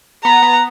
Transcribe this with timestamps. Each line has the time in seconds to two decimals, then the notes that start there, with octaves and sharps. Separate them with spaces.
0.24 B3 A#5
0.42 B3